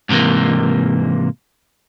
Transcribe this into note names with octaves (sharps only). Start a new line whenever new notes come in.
G#2 C3 D#3 E3 A#3